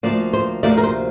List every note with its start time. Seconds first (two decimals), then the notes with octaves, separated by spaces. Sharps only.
0.03 D2 C3 F3 A#3 D5
0.33 C5
0.63 D2 C3 F3 A#3 D5
0.78 A#4
0.84 C5